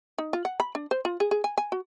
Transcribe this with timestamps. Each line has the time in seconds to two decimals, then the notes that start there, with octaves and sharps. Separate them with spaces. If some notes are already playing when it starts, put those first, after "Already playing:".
0.18 D#4
0.33 F4
0.45 F#5
0.60 B5
0.75 D4
0.91 C5
1.05 F4
1.20 G#4
1.31 G#4
1.44 G#5
1.58 G#5
1.72 F#4